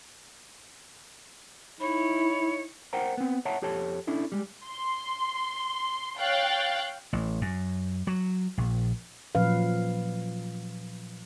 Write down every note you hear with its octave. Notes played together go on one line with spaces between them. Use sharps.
D#4 E4 C#5 B5
A#4 C5 F#5 G5 A#5
B3 C4
C#5 E5 F#5 A5 A#5
F2 G4 A4 C#5 A5
C#4 D4 E4 A4
G3 G#3
C6
C#5 F5 G5 F#6 A6
A1
F#2
F#3
A#1
A#2 F3 F#3 C#4 B4 F5